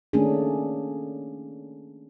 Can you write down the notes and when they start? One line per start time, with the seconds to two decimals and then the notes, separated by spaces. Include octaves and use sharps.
0.13 D#3 A3 A#3 C#4 D4 G#4